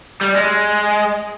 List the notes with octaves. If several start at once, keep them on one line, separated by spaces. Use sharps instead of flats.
G3
G#3